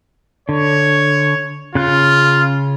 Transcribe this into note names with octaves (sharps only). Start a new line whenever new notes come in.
D3 C#5
C#3 F4 F#6